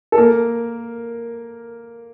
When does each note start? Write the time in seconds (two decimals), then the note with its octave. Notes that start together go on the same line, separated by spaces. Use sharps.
0.12 A4
0.17 A#3 A#4